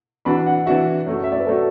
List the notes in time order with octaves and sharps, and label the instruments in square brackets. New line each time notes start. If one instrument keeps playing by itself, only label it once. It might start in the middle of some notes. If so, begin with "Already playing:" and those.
[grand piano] E3 D4 F#4 [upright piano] B5
[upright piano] F#5
[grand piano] E3 D4 F#4 [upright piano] E5
[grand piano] F#2 F#3 A3
[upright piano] E5
D5
B4
[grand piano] F#3 A3 [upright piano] A4